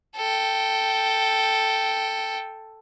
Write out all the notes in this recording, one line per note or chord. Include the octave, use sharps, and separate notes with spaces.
A4 G5